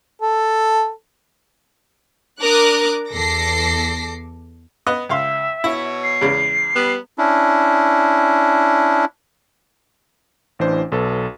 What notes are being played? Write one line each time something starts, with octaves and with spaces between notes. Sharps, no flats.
A4
D4 A#4 D6 D#6 F#6
E2 A4 D6 A#6 C7
B3 D#5 F#6
C#2 E5 F5 C6
B2 E4 C#5
C7
E2 C#3 G#3
G3 B3
C#4 D4 E4
A1 E3 D4 C5
B1 A4 B4